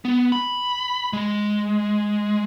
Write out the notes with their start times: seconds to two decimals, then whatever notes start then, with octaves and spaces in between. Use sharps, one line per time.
0.05 B3
0.32 B5
1.13 G#3